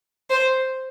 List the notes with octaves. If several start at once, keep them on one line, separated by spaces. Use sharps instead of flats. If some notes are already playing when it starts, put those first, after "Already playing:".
C5